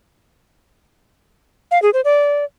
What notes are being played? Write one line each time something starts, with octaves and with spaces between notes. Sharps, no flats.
F5
G#4
C5
D5